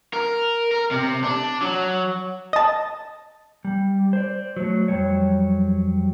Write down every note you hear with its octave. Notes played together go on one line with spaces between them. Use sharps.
A#4
A#4
C3
D4
F#3
D#5 A5
G3
C5 D5
F#3 A3
F2 F#3 G3 C#5